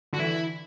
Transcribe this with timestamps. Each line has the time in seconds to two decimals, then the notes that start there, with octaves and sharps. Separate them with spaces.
0.13 D3 F#4
0.19 E3 E4